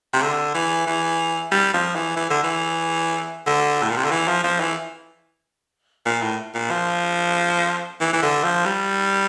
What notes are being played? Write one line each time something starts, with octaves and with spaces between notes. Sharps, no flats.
C3
D3
E3
E3
G3
F3
E3
E3
D3
E3
D3
A2
A#2
C3
D3
E3
F3
F3
E3
A#2
A2
A#2
F3
E3
E3
D3
F3
G3